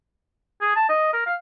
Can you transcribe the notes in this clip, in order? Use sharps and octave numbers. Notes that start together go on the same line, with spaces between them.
G#4
A5
D#5
A#4
F5